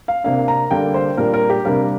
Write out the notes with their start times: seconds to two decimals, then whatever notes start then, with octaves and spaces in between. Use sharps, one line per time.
0.08 F5
0.24 C3 A#3 D4 F5
0.48 A#5
0.71 D3 G3 A#3 D4 G5
0.94 C5
1.17 A#2 G3 D4 A#4
1.34 A#4
1.50 G4
1.65 C3 G3 A#3 D4 A#4